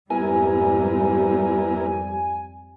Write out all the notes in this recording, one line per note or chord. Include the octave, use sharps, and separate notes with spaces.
F2 G#2 G3 B3 E4 A#4 G#5